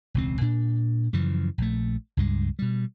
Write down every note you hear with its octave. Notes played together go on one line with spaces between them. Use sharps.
E1 C#2 C4
A#2 D4
F#2 C#3 E3 F3
A#1 A3
C#2 G2 G#3
B2 G3